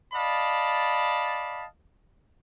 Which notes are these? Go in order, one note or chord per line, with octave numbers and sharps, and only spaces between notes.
D5 D#5 F5 A5 B5